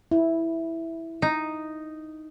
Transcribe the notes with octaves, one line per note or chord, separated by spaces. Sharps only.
E4
D#4